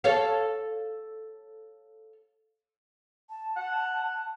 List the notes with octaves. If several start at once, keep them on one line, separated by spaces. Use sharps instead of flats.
A4 C#5 F5
A5
F#5